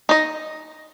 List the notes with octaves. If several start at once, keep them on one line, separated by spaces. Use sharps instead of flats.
D#4 D#5